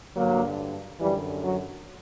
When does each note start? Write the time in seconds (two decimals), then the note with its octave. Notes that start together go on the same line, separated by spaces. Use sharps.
0.16 G2 D3 F#3 A#3
1.00 F#2 D3 E3 G3
1.43 F#3